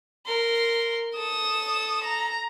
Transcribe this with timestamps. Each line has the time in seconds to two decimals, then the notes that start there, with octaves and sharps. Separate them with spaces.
0.26 A#4 C6
1.17 A4 D#6 E7
2.04 A#5